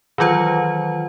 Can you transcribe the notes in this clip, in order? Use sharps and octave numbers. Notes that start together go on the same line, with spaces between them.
D#3 E3 F#3 F4 C5